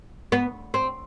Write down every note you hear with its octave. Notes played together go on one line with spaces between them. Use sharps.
B3
C4